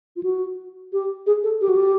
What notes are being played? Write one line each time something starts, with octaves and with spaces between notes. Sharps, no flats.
F4
F#4
G4
G#4
A4
G4
F#4
G4